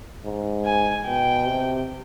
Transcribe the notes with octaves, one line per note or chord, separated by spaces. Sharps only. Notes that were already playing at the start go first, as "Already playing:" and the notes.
G#2
G#5
B2 G5
C3